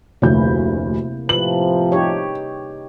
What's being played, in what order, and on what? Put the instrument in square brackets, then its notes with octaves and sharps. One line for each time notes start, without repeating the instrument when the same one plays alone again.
[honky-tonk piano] F1 D2 G6 [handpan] C3 A#3 E4
[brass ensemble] A2 C3 F3 [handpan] B4 [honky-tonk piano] F#7
[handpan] D#4 G4 C#5